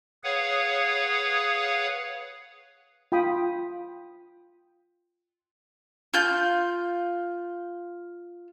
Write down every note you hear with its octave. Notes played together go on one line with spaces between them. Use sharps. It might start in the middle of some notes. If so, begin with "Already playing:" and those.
G#4 B4 C#5 F5 F#5
F4 G5 B5 D#6
F4 G6